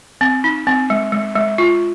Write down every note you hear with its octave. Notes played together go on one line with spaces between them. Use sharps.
C4
D#4
C4
G#3
G#3
G#3
F4